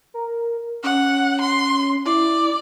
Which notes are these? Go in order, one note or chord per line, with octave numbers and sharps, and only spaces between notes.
A#4
C#4 F#5
C6
E4 D5